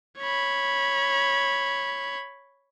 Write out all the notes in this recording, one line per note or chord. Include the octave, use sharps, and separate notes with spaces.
C#5 B5